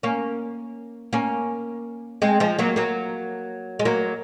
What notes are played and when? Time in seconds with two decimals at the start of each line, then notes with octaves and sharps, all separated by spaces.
0.03 A#3 C#4
1.13 A#3 C#4
2.22 G#3 C4
2.40 F3 G#3
2.59 F#3 A#3
2.76 F#3 A#3
3.79 G#3
3.85 F#3 A#3